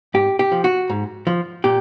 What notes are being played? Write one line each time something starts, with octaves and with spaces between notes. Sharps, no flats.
G#2 G4
G4
F3
F#4
G#2
F3
A#2 G4